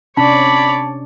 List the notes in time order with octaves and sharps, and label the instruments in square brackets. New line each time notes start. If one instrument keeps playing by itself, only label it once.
[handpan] C3 C#4 D4 [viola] C#5 D5 [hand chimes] A5 [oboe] B5